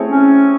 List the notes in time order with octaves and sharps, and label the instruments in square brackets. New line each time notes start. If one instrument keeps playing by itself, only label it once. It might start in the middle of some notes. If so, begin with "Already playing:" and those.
Already playing: [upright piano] A3 C4 E4 G#4 C#5
[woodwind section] C#4